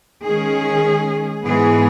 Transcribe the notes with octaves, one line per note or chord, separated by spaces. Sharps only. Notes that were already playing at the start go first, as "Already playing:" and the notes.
D#3 G#3 C#4 G#4
G#2 E3 B3 G#4